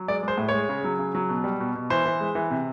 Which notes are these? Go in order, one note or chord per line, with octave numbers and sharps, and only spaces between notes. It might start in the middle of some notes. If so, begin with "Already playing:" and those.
Already playing: F#3
G#3 D5
G#3 C5
A2
G#3 C#5
C#3
F#3
C#3
F#3
B2
G3
B2
B2
E3 C5
E3
G#3
E3
C3